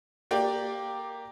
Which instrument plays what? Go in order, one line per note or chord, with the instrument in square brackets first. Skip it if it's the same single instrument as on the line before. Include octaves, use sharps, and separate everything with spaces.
[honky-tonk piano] A#3 G4 D5 G5